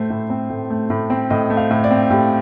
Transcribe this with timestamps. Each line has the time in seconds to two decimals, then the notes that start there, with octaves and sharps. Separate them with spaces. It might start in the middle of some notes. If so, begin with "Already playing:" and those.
Already playing: A2 A3 C5
0.10 A2
0.30 C4
0.50 A2
0.70 A3
0.90 A2
1.10 C4
1.30 A2 D#5
1.50 A3
1.57 F5
1.71 A2
1.84 D5
1.91 C4
2.10 A2 G4